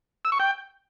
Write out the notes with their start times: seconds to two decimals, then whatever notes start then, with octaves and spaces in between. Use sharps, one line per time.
0.25 E6
0.32 C#6
0.40 G5